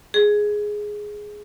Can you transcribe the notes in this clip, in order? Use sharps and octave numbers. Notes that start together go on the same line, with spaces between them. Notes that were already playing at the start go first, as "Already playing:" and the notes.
G#4